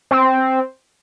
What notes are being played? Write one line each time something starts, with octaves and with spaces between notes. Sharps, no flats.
C4